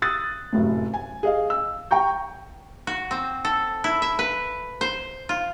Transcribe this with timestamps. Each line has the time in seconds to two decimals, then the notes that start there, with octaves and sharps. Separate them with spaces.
0.02 D#6 E6 F#6 A6
0.53 F1 F#2 A2
0.94 G#5
1.23 G#4 D#5 F5
1.50 E6
1.91 G5 A#5 C#6 G6
2.87 F#4
3.11 C4
3.45 A4
3.84 E4
4.02 E5
4.19 B4
4.81 C5
5.29 F4